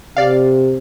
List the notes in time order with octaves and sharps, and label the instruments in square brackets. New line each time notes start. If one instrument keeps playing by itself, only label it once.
[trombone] C3 [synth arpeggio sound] D5 F5